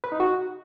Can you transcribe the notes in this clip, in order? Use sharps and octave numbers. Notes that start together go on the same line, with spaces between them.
B4
D#4
F#4